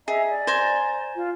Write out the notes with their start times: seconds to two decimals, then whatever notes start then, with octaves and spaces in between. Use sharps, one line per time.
0.08 G#4 D#5 E5 A#5
0.28 D5
0.47 C5 G#5 A#5
1.16 F4